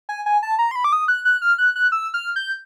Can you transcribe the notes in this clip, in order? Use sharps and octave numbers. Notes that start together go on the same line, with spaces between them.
G#5
G#5
A5
A#5
C6
B5
D6
D#6
F#6
F#6
F6
F#6
F#6
E6
F6
G6